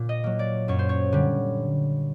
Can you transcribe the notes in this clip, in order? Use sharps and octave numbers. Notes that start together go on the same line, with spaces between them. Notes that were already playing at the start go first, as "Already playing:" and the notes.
Already playing: A#2
D#5
F#3 A#3
D5
F#2 C#5
C5
C#5
D3 G3